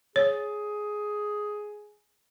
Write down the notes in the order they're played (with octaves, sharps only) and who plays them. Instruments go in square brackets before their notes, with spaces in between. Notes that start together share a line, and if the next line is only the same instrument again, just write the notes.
[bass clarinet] G#4 [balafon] C#5